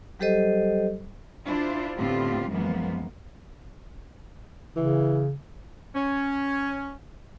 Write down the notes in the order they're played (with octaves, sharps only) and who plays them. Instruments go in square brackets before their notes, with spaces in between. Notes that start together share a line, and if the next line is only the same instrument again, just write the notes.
[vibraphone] F#3 G3 G4 A4 C5 D#5
[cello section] D4 E4 F4 C5
A2 D3 B3 C4 F4 G4
F#2 E3 F3 G#3 A#3 B3
[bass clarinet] C#3 [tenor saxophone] E3
[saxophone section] C#4